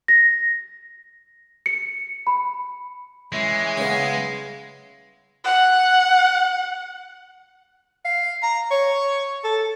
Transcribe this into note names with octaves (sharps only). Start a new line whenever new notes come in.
A#6
C#7
B5
E3 G#3 C#4 E4
C#3 B3
F#5
F5
A#5
C#5
A4